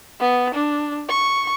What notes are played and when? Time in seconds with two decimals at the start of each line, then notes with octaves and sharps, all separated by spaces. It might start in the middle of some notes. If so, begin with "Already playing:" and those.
0.20 B3
0.55 D4
1.09 C#6